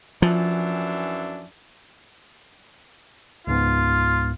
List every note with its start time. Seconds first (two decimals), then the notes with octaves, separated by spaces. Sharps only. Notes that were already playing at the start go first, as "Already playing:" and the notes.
0.22 F#2 E3 F3 D4
3.47 C#2 G#2 B3 F4